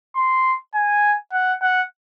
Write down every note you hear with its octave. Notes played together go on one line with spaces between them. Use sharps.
C6
G#5
F#5
F#5